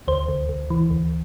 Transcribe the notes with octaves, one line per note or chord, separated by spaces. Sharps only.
D2 C5
D2
D2
E3
D2